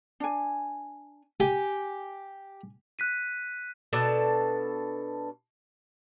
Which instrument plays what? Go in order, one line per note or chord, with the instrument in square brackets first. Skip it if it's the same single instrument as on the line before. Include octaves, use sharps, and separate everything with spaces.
[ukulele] D4 G#5
[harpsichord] G4 [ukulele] G#5
[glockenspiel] F#6 B6 D#7
[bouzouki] B2 D4 A4 A5